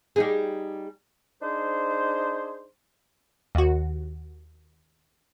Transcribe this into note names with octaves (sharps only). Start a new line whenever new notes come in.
G3 D#4 G#4
D4 D#4 G#4 C5
D#2 F#4